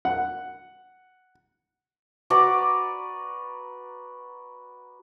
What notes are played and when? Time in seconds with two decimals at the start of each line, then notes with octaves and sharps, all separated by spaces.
0.05 F#5
2.30 F#4 B4 D5 A#5